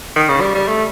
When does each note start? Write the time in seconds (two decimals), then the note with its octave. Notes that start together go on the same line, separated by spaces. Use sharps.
0.16 D#3
0.29 C#3
0.41 G3
0.54 G3
0.68 A3